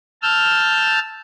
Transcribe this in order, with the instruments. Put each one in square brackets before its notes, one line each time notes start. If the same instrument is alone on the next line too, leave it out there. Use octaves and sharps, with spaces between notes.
[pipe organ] A5 E6 F6 G6